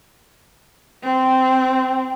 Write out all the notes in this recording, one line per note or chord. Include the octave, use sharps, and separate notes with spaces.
C4